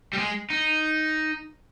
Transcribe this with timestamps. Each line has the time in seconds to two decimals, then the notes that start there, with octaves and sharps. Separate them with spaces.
0.13 G3
0.18 G#3
0.50 D#4